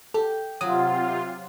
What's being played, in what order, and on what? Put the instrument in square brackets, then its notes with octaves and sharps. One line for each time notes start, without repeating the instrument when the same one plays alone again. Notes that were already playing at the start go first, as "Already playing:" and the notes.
[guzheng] G4 [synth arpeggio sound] A4
[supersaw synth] C3 F4 [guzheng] F#3 [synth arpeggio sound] D#6